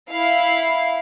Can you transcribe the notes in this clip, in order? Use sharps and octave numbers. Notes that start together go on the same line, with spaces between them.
E4 F5